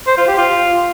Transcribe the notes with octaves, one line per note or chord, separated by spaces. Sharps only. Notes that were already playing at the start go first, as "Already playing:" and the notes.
C5
F4
G4
F4